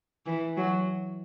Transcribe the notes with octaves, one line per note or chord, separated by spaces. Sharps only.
E3
F#3